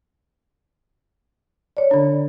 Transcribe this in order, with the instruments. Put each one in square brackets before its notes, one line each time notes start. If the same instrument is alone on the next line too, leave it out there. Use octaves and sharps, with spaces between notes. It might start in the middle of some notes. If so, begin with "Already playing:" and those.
[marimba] C#5 D5
[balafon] D3 D4